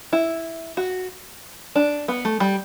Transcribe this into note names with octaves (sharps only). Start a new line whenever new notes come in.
E4
F#4
D4
B3
A3
G3